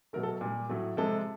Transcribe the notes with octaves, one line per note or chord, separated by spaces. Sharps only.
B2 F#3 A3 A#4
A4
A#2 G3
A2 F#3 A3
C3 F3 G#3 A4